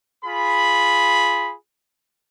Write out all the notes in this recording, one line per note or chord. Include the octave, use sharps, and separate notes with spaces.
F4 G#4 B5